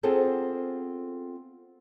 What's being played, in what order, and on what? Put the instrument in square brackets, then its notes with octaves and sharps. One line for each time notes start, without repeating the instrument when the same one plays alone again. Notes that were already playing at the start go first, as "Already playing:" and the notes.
[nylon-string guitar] B3 C4 F4 G#4 A4 C5